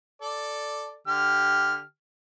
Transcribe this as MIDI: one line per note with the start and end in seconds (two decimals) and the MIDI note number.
0.22 0.96 69
0.22 0.96 74
1.07 1.82 50
1.07 1.82 67
1.07 1.82 89